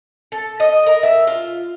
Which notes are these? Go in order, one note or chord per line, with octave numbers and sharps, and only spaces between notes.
A4
D#5
A#4
E5
F4